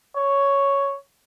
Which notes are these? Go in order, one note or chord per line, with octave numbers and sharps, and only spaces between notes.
C#5